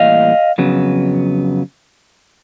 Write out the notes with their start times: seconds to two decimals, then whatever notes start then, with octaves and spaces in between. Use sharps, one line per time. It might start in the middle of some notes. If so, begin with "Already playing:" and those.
Already playing: A2 E3 G3 A#3 D#5 F5
0.58 F2 C#3 F#3 B3